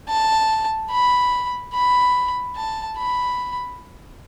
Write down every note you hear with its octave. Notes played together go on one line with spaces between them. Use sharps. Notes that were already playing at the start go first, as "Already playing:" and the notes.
A5
B5
B5
A5
B5